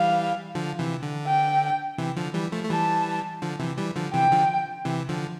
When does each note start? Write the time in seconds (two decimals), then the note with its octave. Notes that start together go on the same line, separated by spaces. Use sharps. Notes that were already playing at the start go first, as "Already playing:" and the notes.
Already playing: E3 G3 F5
0.55 D3 F3
0.79 C3 E3
1.03 D3
1.27 G5
1.98 C3 E3
2.16 D3 F3
2.34 E3 G3
2.52 F3 A3
2.64 A3
2.70 E3 G3 A5
3.42 D3 F3
3.60 C3 E3
3.78 E3 G3
3.96 D3 F3
4.14 C3 E3 G5
4.32 D3 F3
4.85 C3 E3
5.09 D3 F3